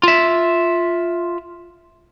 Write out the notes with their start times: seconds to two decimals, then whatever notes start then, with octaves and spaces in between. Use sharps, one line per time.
0.03 F4 E5